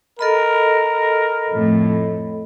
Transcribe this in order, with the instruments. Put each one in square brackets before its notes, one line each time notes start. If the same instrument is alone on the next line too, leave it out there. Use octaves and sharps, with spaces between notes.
[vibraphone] A4 D#5 B5 [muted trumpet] A#4
[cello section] F2 A2